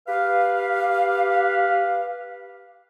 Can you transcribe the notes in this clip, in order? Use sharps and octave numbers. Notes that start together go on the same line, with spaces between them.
G4 B4 F5